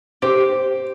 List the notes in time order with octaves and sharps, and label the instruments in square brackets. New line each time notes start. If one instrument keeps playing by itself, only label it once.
[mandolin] G4 [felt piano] C5